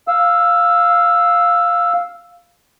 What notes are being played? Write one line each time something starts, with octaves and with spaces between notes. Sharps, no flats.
F5 E6